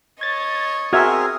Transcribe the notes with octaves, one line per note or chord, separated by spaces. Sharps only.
C#5 D#5 G#6 A6
C4 F#4 G#4 A#4 E5 D#6 F6 G#6